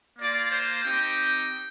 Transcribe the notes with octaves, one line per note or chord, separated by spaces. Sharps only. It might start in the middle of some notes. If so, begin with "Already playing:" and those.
A#3 F4 D5
C5
C4 D#4 G4 G5